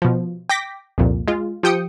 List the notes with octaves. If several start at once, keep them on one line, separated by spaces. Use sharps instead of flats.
B2 F3
G5 D6 A#6 B6
C2 F2 A#2
G#3 F4
F3 G4 G5 D#6 C#7